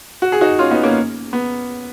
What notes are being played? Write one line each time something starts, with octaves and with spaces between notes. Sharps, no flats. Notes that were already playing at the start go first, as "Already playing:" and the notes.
F#4
G#4
D#4 F#4
C#4 F4
B3 D#4
A#3 C#4
B3